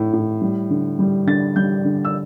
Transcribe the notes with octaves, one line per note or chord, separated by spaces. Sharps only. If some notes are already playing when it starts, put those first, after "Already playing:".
Already playing: A2 A3
A2
G3
D3
G3
D3 A6
G3 G6
D3
E6